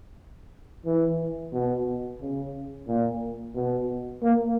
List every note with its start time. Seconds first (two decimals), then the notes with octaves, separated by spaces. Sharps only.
0.85 E3
1.53 B2
2.21 C#3
2.87 A#2
3.55 B2
4.22 A#3